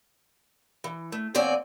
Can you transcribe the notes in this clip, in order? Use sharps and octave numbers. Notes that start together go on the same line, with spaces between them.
E3
A3
E2 A#2 C4 C#5 D5 G#5